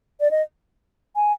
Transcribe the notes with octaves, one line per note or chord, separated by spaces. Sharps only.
D5
D#5
G#5